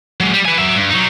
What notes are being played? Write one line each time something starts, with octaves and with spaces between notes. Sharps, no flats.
F#3 G#3
G3
B4 G#5
F#3 E5
G2
F#3 D#4